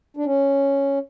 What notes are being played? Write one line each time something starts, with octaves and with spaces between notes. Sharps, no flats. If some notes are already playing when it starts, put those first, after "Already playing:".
D4
C#4